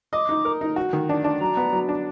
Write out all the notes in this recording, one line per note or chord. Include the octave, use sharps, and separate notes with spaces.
D#5 D6
D#4
A#4
D#4
F#4
D#3
D4
D4
F#3 A#5
B3
F#3
D4